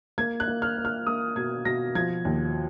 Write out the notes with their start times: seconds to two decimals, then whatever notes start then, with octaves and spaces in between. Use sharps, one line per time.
0.18 A#3 G#6
0.40 F#6
0.47 A#3
0.62 F6
0.77 A#3
0.85 F6
1.07 A#3 D#6
1.36 B2 G#6
1.65 B2 A#6
1.95 F3 G#6
2.25 D#2